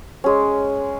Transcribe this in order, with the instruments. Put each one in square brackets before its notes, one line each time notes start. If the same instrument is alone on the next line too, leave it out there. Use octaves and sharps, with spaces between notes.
[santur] G#3 C#4